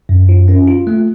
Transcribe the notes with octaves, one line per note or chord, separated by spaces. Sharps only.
F#2
F4
C#4
F4
A3